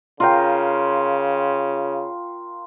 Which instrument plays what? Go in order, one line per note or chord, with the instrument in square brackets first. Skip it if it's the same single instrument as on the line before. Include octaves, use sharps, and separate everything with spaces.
[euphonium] C#3 [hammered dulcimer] F4 A#4 G5